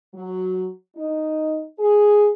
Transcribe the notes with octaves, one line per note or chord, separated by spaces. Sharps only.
F#3
D#4
G#4